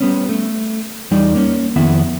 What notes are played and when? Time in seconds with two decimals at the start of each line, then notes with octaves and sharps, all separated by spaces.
0.01 G3 B3 C#4
0.29 A3
1.11 E2 G3 D#4 D5
1.34 A#3 C#4
1.76 F2 D#3 B3 E4